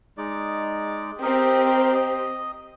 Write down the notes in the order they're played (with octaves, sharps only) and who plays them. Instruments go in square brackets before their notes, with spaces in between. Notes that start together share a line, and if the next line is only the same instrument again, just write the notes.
[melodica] G#3 D#4 D5
[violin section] C4 G4 [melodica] A#4 D#5
[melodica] D#5